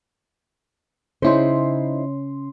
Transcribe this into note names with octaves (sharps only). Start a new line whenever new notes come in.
C#3 C#4 D#4 E4 C5 C6